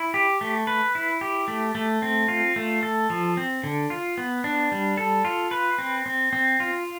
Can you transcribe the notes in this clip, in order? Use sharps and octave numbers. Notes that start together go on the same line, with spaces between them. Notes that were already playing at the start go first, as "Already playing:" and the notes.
Already playing: E4
G4
A3
B4
E4
G4
A3
A3
C4
F4
A3
A4
F3
C4
D3
F4
B3
D4
G3
A4
F4
B4
C4
C4
C4
F4